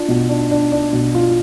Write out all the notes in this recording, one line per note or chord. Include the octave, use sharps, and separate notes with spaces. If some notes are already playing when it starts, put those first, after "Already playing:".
Already playing: D4 F4
B2
D4
D4
D4
B2
F4